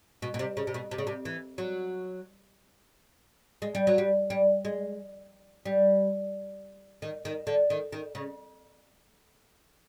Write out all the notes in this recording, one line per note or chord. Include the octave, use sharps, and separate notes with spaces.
B2
B2
C3
C#3
C3
B2
C3
C#3
C3
E3
F#3
G#3
G3
F#3
G3
G3
G#3
G3
D#3
D#3
D3
D#3
D#3
C#3